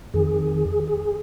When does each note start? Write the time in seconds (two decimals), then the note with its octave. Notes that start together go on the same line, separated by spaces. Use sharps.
0.14 F2 D#3 G#4
0.87 G#4